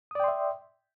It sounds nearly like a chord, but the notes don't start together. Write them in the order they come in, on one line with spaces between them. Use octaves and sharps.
D#6 D5 G5 C6 E5